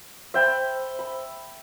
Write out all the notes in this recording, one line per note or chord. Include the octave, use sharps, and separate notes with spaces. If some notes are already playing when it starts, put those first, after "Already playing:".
C5 E5 G5 B5
B5